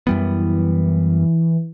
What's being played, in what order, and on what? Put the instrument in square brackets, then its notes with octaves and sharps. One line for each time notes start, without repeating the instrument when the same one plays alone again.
[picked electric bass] F#2 G3 B3 [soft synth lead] E3